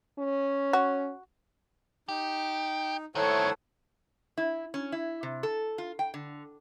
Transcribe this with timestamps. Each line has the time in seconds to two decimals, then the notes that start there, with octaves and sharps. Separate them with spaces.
0.19 C#4
0.73 F#4
2.09 D#4 G4
3.15 G2 D#3 A3 E4 A4 C5 C#5 F#5
4.38 E4
4.74 C#4
4.92 E4
5.23 C3
5.43 A4
5.78 F4
5.99 G5
6.14 D3